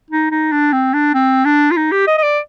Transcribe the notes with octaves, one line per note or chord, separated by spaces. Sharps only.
D#4
D#4
D4
C4
D4
C4
D4
F4
D#4
G4
D#5
D#5
D5